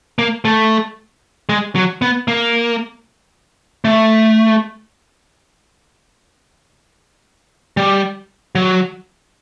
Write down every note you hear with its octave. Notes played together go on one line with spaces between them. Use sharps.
A#3
A3
G#3
F#3
B3
A#3
A3
G3
F#3